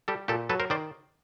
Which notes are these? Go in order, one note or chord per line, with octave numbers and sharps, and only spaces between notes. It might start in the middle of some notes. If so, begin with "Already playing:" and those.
G3 G4 A4
A#2 G4 A4
F#3 A4 B4
A#4 C5
D#3 C5 D5